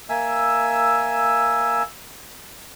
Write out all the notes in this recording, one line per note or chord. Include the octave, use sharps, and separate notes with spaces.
A#3 E5 G#5 E6